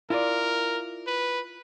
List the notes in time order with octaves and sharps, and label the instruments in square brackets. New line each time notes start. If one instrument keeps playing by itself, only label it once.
[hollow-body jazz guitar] E4 F4 D5 [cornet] A#4
[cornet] B4